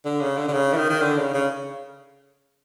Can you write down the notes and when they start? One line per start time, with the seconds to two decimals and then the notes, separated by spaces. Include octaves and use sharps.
0.05 D3
0.21 C#3
0.37 D3
0.48 D3
0.53 C#3
0.73 E3
0.77 D#3
0.90 D#3
1.02 D3
1.17 C#3
1.34 C#3